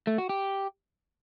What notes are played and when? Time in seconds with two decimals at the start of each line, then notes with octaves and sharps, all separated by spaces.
0.07 A3
0.18 F#4
0.29 G4